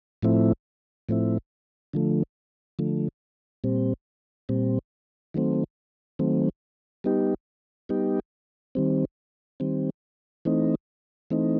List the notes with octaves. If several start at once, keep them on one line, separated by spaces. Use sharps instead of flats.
A2 F3 A3 C4 E4
A2 F3 A3 C4 E4
D3 F3 A3
D3 F3 A3
A#2 G3 C4
A#2 G3 C4
D#3 F#3 A3 C4
D#3 F#3 A3 C4
G3 B3 D#4 G4
G3 B3 D#4 G4
D#3 G3 C4
D#3 G3 C4
E3 A3 C4 D#4
E3 A3 C4 D#4